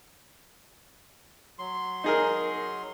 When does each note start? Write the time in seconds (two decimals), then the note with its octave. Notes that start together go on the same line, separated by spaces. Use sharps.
1.59 F#3 C6
2.04 D#4 G#4 A#4